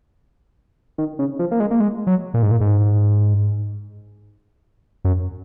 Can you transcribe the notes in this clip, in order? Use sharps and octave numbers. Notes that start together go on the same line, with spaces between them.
D#3
C#3
F3
A#3
G#3
A#3
G#3
F#3
A#2
G#2
A#2
G#2
F#2